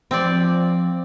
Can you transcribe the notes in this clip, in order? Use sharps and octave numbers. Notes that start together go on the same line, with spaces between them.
F3 C4 D5